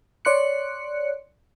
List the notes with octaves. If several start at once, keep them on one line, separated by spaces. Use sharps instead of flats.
C#5 D5 C6 F#6 C#7